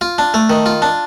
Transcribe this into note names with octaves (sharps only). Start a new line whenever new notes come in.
F4
D4
A3
D#3
F4
D4